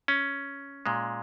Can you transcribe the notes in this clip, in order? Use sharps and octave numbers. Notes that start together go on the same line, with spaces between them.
C#4
A#2 G#3